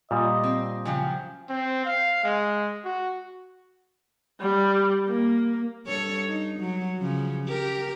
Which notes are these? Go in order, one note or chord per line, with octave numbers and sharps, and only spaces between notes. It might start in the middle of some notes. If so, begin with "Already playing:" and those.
A#2 G3 F4 D#5 D#6
C4
C#3 F3 F#3 G5
C4
F5
G#3
F#4
G3
A#3
G2 A4 C#5
D#4
F#3
C#3 F3
G4 A#4